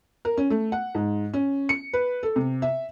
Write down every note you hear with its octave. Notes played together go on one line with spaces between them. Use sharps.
A#4
C#4
A3
F#5
G#2
C#4
C#7
B4
A4
C3
E5